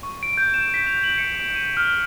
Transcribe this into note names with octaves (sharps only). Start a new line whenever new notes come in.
C#6
D7
G6
E7
B6
F7
F#7
C#7
D7
D#7
F6